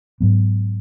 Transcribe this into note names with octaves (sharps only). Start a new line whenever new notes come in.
G#2 F#3 B3